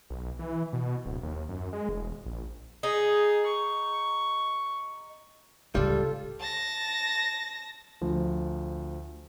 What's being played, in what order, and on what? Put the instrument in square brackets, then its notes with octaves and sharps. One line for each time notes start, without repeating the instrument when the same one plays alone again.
[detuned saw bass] B1
E3
B2
D1
D#2
F#2
G#3
E1
A#1
[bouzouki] D#4 [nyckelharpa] G#4
[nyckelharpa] C#6
[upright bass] C#2 A2 [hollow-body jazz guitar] G3 [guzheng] F4 A4
[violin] A5 A#6
[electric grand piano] D2 F3